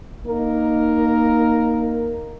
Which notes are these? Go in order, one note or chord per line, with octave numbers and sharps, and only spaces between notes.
A#3 D#4 A#4